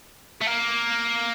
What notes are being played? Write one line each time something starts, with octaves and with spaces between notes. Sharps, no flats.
A3
A#3